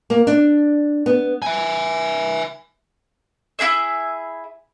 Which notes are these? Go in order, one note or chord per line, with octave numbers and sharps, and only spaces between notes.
A#3
D4
B3
E5 G#5
E4 F4 G#4 E5